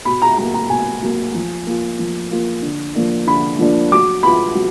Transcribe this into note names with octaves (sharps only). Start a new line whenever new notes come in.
B2 B5
A#5
F#3 A#3 A#5
A#5
B2 G#5
F#3 A#3
F3
A#3 F4
F3
A#3 F4
D3
F3 A#3 D4
D3 B5
F3 A#3 D4
F#3 D6
B3 F4 B5
F#3